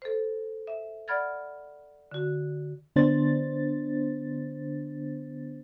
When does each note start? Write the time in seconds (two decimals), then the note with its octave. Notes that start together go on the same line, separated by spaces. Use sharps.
0.02 A4 C5
0.67 E5
1.08 D5 F#5 B5 F6 G#6 A6
2.11 D3 F#4
2.96 D3 B3 D4 C5 A6